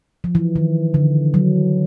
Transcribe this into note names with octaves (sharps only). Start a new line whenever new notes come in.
F3
E3
D#3
D3
F#3